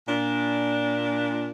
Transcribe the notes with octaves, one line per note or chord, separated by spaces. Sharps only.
A#2 D4